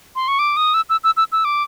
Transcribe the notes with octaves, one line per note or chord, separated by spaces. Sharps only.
C6
C#6
D6
D#6
E6
E6
E6
E6
E6
D6